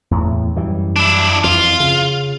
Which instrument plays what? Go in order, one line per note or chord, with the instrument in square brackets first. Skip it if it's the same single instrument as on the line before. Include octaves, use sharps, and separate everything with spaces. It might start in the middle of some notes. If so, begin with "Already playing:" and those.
[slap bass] E2 A2
F#2 E3 G3
[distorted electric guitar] D4 E4
[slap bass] F2 E3 [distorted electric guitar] F4
[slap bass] C#3